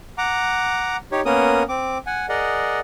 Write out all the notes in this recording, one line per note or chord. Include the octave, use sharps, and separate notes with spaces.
F#5 A#5 D6
D#4 G4 C#5
A#3 B3 C#4 A#4 D#6
C4 D6
F#5 G#5
G#4 A#4 D5 D#5 F#5